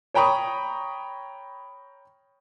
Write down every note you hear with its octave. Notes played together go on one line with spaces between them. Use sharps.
C#5 G5 A#5 B5 C#6 D#6